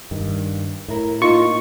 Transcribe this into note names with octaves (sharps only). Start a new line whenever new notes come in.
G2 D#3
A2 E4 A#4
A#3 D#4 F4 C#6